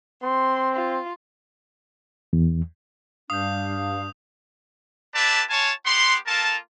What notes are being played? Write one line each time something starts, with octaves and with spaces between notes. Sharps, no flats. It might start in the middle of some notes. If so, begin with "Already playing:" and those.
C4 C6
F4
E2
G2 D4 F5 D#6 G6
D4 G4 B4 D5 E5 A5
F4 C#5 G#5 A5
B3 G4 F#5 C6
A#3 F4 A4 A#4 A5